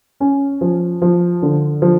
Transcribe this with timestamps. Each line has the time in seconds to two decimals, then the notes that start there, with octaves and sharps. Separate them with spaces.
0.20 C#4
0.61 F3
1.02 F3
1.42 D3
1.82 F3